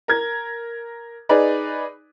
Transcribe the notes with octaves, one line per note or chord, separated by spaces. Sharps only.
A#4 G#6
D#4 G#4 B4 D5